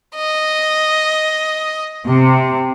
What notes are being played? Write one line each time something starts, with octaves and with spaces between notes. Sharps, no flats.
D#5
C3